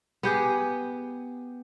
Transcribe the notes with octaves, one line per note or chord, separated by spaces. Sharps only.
B3 G4 G#4